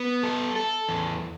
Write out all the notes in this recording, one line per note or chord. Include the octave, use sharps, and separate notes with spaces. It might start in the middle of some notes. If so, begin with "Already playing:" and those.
Already playing: B3
A4
A4
E2